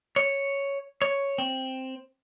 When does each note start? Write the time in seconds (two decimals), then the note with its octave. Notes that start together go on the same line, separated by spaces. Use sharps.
0.16 C#5
1.02 C#5
1.38 C4